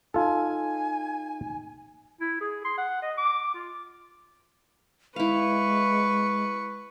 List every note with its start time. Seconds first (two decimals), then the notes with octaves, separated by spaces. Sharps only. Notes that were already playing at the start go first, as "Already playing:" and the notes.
0.14 D#4 F4 A4 G#5
2.21 E4
2.41 G#4
2.65 C6
2.78 F#5
3.02 D#5
3.18 D6
3.55 F4
5.16 G#3 E4 B4 F5 C#6